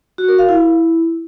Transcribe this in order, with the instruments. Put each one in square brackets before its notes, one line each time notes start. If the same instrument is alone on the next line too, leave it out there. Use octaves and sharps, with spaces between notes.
[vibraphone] F#4
A#4
F5
E4